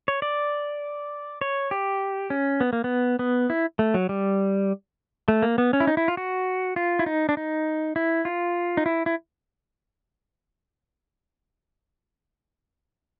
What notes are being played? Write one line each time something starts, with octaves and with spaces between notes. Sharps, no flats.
C#5
D5
C#5
G4
C#4
B3
A#3
B3
B3
E4
A3
F#3
G3
A3
A#3
B3
C#4
E4
D#4
E4
F4
F#4
F4
E4
D#4
D4
D#4
E4
F4
D#4
E4
E4